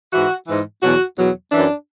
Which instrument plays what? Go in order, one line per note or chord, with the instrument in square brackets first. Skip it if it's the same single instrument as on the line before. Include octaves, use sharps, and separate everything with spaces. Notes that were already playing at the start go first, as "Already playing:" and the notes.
[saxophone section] G#2 E3 F#4
G#2 E3
E2 B2 F#3 F#4
E2 B2 F#3
F#2 E3 D4